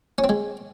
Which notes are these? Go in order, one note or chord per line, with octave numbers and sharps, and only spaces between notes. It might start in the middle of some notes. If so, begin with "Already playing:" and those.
C#4
C4
G#3